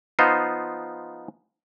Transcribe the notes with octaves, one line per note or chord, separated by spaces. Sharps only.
F3 B3 D#4 F4 C5